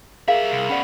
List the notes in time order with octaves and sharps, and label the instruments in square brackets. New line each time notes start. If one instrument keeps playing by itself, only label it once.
[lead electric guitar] G3 E5 [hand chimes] G#4 A#4 [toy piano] F5
[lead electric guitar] C2
[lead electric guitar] B3 C#4 [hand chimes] D5 F#5 B5